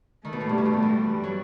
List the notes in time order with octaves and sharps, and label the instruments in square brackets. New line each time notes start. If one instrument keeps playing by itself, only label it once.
[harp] D#3 [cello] A3
[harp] B2
A2
G2
[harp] B2 [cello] A3
[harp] A2
G2
E3
[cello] G3
[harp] F#3